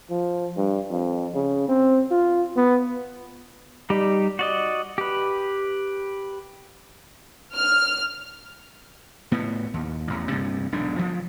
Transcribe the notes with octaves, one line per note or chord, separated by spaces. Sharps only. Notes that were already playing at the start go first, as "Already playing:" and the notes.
F3
G2
F2
C#3
C4
F4
B3
G3 D#4 G4
F#4 D5 D#5
G4 B4
F6
A2 B3
D#2
A1 E2
D2 G2 C3
E1 B1 G#2 D4
D2 F3